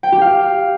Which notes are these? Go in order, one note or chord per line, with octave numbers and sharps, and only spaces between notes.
G5
G4
F5